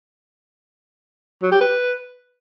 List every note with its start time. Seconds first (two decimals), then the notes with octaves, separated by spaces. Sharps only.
1.42 F#3
1.51 G4
1.61 B4